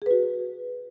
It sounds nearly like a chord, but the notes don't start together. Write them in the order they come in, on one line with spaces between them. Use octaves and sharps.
G#4 B4 F#4